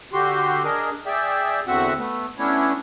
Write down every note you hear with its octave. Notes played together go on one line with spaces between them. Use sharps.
D3 F#4 G4 C6
D4 G#4 A#4 D#5
G#4 D5 E5 G5
E2 D3 C4 F#4 E5 F#5
A3 B3
A3 B3 C#4 D4 E4 C#5